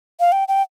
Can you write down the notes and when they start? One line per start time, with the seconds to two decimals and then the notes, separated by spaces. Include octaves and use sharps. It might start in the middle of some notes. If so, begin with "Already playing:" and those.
0.20 F5
0.32 G5
0.48 G5